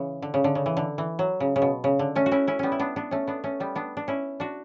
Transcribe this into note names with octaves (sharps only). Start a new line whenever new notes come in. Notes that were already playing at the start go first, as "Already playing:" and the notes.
Already playing: C#3 E3
D3
C#3
D3
C#3
E3
D3
E3
F#3
C#3
C#3
B2
C#3
D3
A3 C#4
F#4
C#4 E4
C#4 E4
G3 B3 C#4
E4
B3 D4
B3 D4
A3 C#4
B3 D4
A3 C#4
G3 B3
B3 D4
D4
C#4 E4
D4 F#4